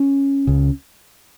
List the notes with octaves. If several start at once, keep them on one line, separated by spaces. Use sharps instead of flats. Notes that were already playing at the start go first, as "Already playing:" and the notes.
Already playing: C#4
C#2 C#3